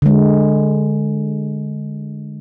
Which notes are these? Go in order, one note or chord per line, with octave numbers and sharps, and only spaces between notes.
D3 G#3